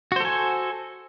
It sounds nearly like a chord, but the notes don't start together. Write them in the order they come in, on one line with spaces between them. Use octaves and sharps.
F#4 C5 A4 G#5